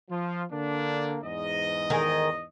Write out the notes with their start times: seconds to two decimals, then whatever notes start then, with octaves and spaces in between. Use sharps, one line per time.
0.10 F3 F4
0.51 D3 A#3 D4
1.23 E2 G#2 D#5
1.90 D#3 G#4